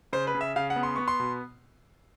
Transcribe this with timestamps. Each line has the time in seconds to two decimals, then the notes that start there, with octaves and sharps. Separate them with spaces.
0.13 C#3 C5
0.27 B4
0.35 C#3
0.41 E5
0.56 C#3 F5
0.70 F#5
0.76 B3
0.83 C6
0.96 B3 C#6
1.08 C6
1.20 B2